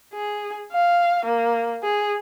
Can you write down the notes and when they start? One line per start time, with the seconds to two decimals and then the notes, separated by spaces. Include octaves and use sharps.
0.14 G#4
0.72 F5
1.25 A#3
1.83 G#4